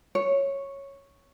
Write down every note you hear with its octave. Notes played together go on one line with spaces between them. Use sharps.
C#5